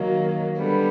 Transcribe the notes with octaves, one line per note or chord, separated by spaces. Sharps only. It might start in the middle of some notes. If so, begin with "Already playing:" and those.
Already playing: D#3 F#3 A#3
D3 G3 B3